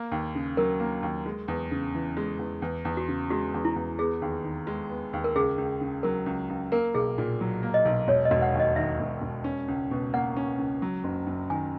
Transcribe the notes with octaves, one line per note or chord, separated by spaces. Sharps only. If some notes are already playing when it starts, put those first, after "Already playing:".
Already playing: A#3
D#2
C#3
F#3 A#4
A#3
D#2
G#3
E2
C#3
E3
G#3
E2
E2
E2
F#4
C#3
G#3 F#4
E2
E4
E2
B3 G#4
D#2
D#3
G#3
B3
D#2
A#4
C#2 G#4
C#2
C#3
F#3 A#4
C#2
C#2
A#3 A#4
B1 G#4
A#2
F#3
A#3
D#5
B1
E1 C#5
D#5
E1
F#5
D#2
D#5
D#3 E5
E1
E1
C#4
C#2
B2
A#3 F#5
C#4
C#2
F#3
F#1
F#2
D#3 G#5